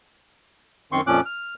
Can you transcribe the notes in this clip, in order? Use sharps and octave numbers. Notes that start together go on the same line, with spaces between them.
F#2 D#3 C4 C6 C#6
F2 A#2 F3 C#4 D6 F#6
F6